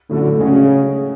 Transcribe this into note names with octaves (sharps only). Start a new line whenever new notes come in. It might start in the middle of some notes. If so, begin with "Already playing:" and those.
A2 D3 F#3 A3
C#3 G#3 C#4 F#4